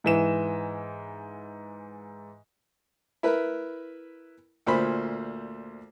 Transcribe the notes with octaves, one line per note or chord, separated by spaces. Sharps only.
G#2 E3 E7
E4 A#4 B4
D2 A#2 C5 B5